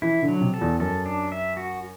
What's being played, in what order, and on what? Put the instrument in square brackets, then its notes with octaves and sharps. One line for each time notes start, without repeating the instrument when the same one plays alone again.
[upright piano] E3 [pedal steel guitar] E4
[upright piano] D3
[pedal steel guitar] F#3
[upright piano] C3
[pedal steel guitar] A4
[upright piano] E2
[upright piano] F#2 [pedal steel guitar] A4
[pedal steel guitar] D4
E5
F#4